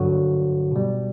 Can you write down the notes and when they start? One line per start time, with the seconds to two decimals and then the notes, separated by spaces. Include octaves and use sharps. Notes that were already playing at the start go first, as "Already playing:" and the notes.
Already playing: G2 D3 F#3 F#4
0.72 B2 G3